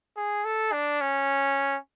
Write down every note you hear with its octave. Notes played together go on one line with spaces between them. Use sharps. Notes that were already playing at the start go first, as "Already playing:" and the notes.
G#4
A4
D4
C#4